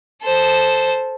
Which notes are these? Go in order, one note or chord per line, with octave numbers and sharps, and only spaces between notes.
A4 C5